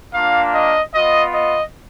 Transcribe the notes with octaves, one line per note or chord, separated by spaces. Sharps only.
A#3 D4 F4 F5
D#5
B3 F4 D#5
D#5